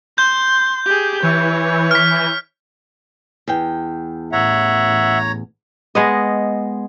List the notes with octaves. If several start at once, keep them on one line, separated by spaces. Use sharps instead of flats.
C6 G6
G4 G#4
E3 C#5
F6 B6
E2 G5
A1 C#5 E5 F#5 A#5
G#3 B3 D#5